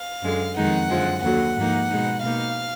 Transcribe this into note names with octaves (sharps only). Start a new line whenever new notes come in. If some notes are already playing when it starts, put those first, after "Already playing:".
Already playing: F5
F#2 D3 G#3
F2 D#3 G#3 D#4 F#5
F#2 D3 F3 G#3
D#2 D3 F#3 F#5
G#2 F3 A#3 D#4
B2 G#3 D#4
B2 A#3 D#4 F5